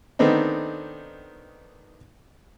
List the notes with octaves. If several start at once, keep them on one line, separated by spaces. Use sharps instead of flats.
D#3 A3 B3 C4 D4 D#4